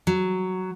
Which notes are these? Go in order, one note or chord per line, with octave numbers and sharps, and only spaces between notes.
F#3